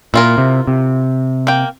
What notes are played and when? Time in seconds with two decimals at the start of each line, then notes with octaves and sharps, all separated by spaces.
0.14 A#2 E4 F4 A#4
0.38 C3
0.67 C3
1.47 A#3 G5